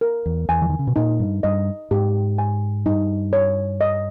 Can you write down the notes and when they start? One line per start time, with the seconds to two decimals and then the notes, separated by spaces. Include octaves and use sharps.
0.01 A#4
0.26 E2
0.49 E2 G#5
0.62 E3
0.70 D#3
0.79 C#3
0.87 B2
0.96 A#2 D#4
1.19 G2
1.43 G2 D#5
1.91 G#2 G4
2.38 G#5
2.86 G2 D#4
3.33 C#5
3.81 D#5